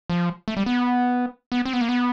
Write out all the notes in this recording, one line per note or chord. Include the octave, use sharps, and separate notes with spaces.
F3
A3
G3
B3
B3
C4
B3
A#3
B3